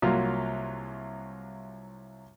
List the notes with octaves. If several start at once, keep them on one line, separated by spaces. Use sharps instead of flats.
C2 F#3 A#3 F4 F6